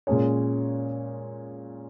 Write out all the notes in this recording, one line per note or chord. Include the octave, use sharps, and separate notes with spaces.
A#2 G#3 C#4 G#4 C#5